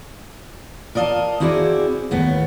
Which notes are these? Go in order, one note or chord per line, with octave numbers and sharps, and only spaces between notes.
A#4 D5 D#5 F5 A5
C4 E4 F#4 G#4 C5 D5
D#2 A2 B3